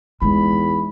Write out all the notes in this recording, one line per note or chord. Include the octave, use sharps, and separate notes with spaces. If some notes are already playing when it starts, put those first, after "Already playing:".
E2 G#3 D#4 B5